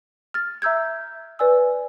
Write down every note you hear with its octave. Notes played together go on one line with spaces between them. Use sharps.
F6 A6
E5 A#5 E6 G6 G#6
B4 D5 G#5 E6